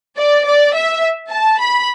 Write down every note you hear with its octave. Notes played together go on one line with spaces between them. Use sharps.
D5
D5
E5
A5
B5